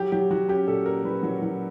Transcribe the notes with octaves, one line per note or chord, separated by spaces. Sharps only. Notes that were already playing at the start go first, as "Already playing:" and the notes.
Already playing: F#3 G4
F#3 G4
F#3 F#4
C#4 G4
A#2 A4
A#3 A#4
F#3 B4
F#3
F#3